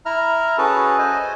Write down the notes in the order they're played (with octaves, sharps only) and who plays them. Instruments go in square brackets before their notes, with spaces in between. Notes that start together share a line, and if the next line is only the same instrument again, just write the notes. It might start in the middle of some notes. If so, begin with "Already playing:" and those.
[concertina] E4 E5 A#5 F6
C#4 F#4 G#4 A4 B4 A5
C5 D#5 G#5